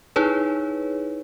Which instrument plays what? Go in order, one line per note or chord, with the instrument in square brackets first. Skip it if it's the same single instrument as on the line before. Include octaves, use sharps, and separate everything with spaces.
[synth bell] D#4 E4 G#4 B4 C#5